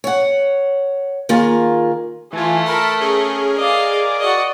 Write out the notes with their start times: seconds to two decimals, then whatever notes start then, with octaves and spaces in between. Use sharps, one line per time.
0.04 C#5 F#5
1.29 D#3 A#3 F4 G#4 A#4
2.33 E3 A3 F4 G#5
2.66 A#4 A5 B5
3.01 C#4 G#4 A#4
3.56 D5 D#5 F5 D6
4.20 F#4 D5 D#5